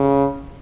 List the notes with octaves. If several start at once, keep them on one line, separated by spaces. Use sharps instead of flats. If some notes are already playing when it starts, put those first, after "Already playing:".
Already playing: C#3